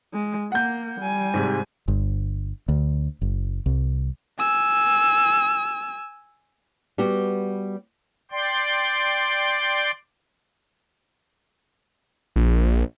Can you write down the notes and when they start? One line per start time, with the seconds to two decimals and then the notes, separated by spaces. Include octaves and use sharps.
0.13 G#3
0.52 A#3 F#5 G6
1.00 G3 G#5
1.34 G#2 C3
1.88 G1
2.68 D2
3.21 F#1
3.66 C2
4.39 G#5 E6
6.98 G3 B3 F#4 G4
8.32 D5 G5 C6
12.36 A#1